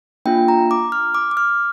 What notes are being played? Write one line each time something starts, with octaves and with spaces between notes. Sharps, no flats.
A#3 D4 F4 G5
A#5
D6
F6
D6
D6
F6